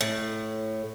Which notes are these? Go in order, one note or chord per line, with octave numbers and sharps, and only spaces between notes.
A2